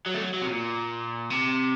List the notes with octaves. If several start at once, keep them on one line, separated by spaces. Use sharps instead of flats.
F#3
A3
F#3
F#3
C3
A#2
C3